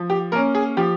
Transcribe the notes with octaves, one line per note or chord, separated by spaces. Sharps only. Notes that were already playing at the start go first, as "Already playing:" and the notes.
Already playing: F3
G4
A#3 C#4 A#4
G#4
F3 G4